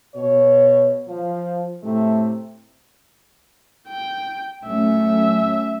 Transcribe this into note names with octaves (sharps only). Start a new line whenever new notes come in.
B2 C#5
F3
A2 C3 A3
G5
F#3 A3 C#4 E5